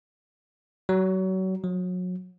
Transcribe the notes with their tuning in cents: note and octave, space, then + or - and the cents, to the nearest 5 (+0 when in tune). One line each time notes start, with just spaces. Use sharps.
F#3 +30
F#3 -30